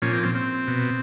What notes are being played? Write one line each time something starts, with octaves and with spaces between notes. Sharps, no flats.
A#2 F3 C#4
C4
C4
C4
B2